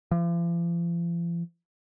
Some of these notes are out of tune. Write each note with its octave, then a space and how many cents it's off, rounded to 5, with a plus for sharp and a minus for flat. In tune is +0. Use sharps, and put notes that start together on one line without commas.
F3 -45